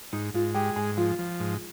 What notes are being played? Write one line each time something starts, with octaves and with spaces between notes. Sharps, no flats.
G#2 D#4
G#2 F4
G#3 G4
G#2 G#4
F3 F4
F3
G#2